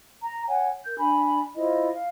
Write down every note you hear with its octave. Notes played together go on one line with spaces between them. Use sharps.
A#5
C#5 F#5 G#5
A#4 G6
D4 G#5 B5
E4 F4 C5 D#5
F5